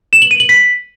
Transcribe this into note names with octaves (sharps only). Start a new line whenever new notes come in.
E7
F#7
D#7
F#7
B6